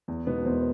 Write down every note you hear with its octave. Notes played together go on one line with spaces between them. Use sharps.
E2
B2 G#3 B3 D#4
E2 A#4 C5